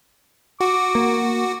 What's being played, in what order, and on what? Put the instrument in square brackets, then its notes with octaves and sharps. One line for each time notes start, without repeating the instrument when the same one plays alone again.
[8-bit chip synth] F#4 [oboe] D6
[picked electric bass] A#3